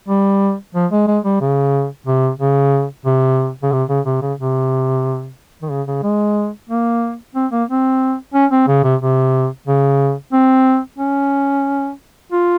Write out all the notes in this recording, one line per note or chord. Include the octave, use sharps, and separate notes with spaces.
G3
F3
G#3
G#3
G3
C#3
C3
C#3
C3
C#3
C3
C#3
C3
C#3
C3
D#3
C#3
C#3
G#3
A#3
C4
A#3
C4
C#4
C4
C#3
C3
C3
C#3
C4
C#4
F4